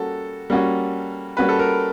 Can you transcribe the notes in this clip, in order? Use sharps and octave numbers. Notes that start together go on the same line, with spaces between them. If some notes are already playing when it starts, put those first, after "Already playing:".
Already playing: G3 A#3 C#4 F#4 A4
G3 A#3 C#4 F#4
G3 A#3 C#4 F#4 B4
A4
A#4